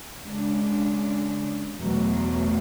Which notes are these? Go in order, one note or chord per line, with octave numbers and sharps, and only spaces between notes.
C#3 G#3 D4
E2 B2 F#3 A3